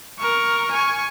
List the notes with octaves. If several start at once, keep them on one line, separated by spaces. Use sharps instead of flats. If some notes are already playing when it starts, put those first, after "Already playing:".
A#4 C#6
G#5 C#6